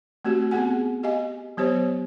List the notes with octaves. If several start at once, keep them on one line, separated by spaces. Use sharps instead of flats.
A3 C4 F#4 G4
B3 C4 G#4 F#5 G#5
G4 D#5 F5 G#5
F#3 B3 G4 C5 C#5